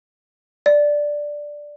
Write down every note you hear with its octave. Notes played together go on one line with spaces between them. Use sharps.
D5